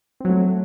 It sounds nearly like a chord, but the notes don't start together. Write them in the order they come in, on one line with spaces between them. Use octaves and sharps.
C4 F#3 A3